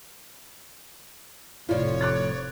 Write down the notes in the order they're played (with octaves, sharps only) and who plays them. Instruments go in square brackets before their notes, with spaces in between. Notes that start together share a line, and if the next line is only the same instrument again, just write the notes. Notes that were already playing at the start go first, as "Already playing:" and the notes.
[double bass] F1 [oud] A2 F3 [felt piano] F4 D5 [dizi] C#5
[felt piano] D6 F#6 A6